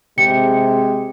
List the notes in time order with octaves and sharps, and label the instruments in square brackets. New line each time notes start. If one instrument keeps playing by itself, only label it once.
[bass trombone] C3 [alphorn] G#3 [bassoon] G4 [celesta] C#7